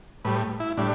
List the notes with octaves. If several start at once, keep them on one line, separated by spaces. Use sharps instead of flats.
A2 G3 B4
E4
A2 G3 D4